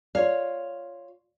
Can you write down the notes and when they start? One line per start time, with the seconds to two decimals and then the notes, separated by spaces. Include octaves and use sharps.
0.15 F4 C#5 D5 F5